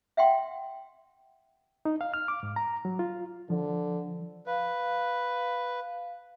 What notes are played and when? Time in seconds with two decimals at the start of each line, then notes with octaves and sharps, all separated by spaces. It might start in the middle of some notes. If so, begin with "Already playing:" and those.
0.17 E5 F#5 G5 C6
1.85 D#4
2.01 F5
2.14 F6
2.28 D6
2.43 G#2
2.56 A#5
2.85 F#3
2.99 F4
3.50 D3 F3
4.47 B4 F5